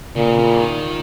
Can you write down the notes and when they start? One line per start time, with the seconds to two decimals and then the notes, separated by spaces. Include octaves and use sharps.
0.16 A#2 C#3
0.39 C#3
0.50 E3
0.61 D#3